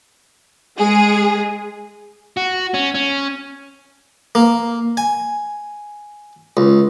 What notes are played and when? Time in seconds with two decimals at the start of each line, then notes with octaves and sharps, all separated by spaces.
0.78 G#3 G#4
2.37 F#4
2.74 C#4
2.94 C#4
4.35 A#3
4.97 G#5
6.57 C#2